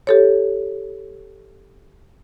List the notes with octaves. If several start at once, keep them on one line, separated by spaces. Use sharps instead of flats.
G4 A4 C#5